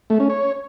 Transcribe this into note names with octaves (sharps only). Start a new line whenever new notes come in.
A3
C#4
C#5